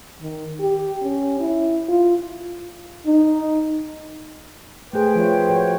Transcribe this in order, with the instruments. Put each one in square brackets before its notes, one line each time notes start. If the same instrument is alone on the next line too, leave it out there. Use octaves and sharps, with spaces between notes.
[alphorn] D#3
G4
C#4
E4
F4
[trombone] D#4
[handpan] A3 G#4 [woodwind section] B4 C5 G5
[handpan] F3 F4 C#5
F#4 C#5